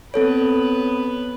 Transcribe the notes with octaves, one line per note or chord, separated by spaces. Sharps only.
B3 C4 A4 B4 C#5